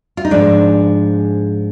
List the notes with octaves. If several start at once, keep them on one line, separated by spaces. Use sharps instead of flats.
F4
D#4
G#2 F3 G#3 D4